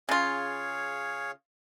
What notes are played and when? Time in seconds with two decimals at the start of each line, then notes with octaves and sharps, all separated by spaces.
0.09 C#3 F4 G#4 C#5 F5